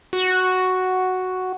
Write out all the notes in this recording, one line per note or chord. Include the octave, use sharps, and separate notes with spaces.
F#4